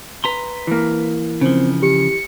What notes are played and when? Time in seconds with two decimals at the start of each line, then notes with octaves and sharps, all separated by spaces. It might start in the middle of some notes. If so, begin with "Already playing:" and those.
0.24 B4 A#5 C6
0.67 E3 A#3
1.41 C#3 F3 C4
1.83 G4 C#7